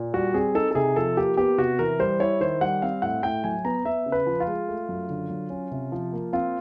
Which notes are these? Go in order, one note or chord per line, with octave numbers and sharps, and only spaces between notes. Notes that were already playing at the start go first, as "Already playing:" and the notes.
Already playing: A#2
G3 F#4
C4 G#4
D#4 A4
A4
C3 G#4
F3 A4
A#3 G4
B3 G4
C3 F#4
E3 A#4
G3 C5
E4 C#5
D#3 C5
G3 F#5
C4 F5
A2 F#5
A2 G5
F#3 G#5
B3 A#5
B3 E5
C#3
B4
F3
F4
G#3
A3
F#2
D3
F#3
C#4
C3
F3
A#3
C4 F4